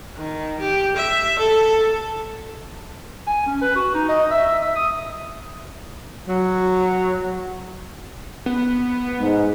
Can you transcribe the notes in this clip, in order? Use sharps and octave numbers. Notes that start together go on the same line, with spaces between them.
D#3
G4
E5
A4
G#5
C#4
B4
F#4
D#4
D#5
E5
E5
E5
D#6
F#3
B3
G#2